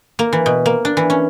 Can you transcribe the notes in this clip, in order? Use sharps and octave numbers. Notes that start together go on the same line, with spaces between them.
A#3
E3
B2
A#3
D4
E3
C#4